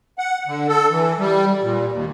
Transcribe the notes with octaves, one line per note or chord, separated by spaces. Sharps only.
F#5
D3
A4
E3
G3
A#2
D#2